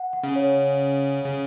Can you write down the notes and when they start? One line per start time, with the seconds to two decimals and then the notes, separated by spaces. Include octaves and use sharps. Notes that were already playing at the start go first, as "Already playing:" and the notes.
Already playing: F#5
0.13 F#5
0.23 C#3
0.36 C#5
1.25 C#3